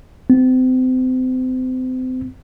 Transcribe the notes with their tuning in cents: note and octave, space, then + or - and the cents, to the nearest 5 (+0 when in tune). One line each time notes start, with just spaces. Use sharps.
C4 -35